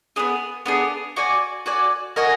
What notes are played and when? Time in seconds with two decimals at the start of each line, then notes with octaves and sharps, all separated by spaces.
0.16 B3 D4 G#4
0.66 B3 D4 G#4
1.16 F#4 D5 G#5
1.66 F#4 D5 G#5
2.16 F#4 A#4 D#5 G#5